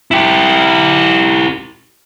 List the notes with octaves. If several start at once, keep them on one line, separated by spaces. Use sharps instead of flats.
E4 G4